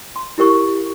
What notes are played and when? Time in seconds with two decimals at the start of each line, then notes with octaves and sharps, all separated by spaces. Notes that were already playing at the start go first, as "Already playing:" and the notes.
0.16 C6
0.38 E4 G4 A#4 C#6